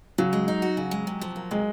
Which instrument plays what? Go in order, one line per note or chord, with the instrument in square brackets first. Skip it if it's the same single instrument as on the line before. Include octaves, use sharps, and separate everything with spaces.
[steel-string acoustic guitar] C#3 [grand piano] F#3
[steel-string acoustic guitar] G#3
D#4
F#4
C#3
G#3
C3
F3
A#3
[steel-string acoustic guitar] C3 [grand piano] G#3